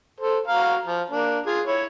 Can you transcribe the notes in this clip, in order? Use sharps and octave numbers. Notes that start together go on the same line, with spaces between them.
A4 C5
F#4 F5 A#5
F3
A#3 D4
F4 G#4
E4 C#5